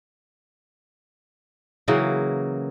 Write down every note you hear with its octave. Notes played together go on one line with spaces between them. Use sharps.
C#3 E3 F#3 A#3